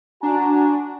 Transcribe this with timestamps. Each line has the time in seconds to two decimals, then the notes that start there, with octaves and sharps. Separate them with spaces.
0.23 D4 F#4 G#5 A#5